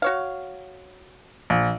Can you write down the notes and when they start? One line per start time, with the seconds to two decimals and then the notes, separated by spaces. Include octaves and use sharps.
0.02 F#4 C#5 F5
1.50 A#1